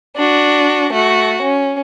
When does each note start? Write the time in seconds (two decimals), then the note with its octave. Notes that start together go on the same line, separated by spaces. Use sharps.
0.17 D4 F#4
0.93 A3 F#4
1.42 C#4